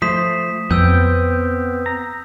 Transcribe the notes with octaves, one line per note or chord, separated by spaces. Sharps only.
F3 A3 C5 D#6 B6
F2 B3 C4 G5 E6 G6
A#5